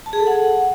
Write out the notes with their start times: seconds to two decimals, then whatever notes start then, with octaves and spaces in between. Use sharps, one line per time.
0.06 A5
0.13 G#4
0.20 A4
0.27 F#5